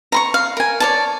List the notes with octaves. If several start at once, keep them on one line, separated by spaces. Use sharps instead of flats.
A#5 C6 C#6
F5
A#4 G#5
C#5 D5 A5